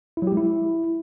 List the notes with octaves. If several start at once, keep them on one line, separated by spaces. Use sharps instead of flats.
E4
F#3
G4
G#3
E4